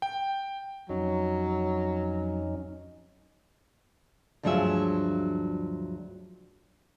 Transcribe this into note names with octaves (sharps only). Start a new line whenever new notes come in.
G5
F2 F#3 C#4 D#4
D2 G2 F3 F#3 G#4 E5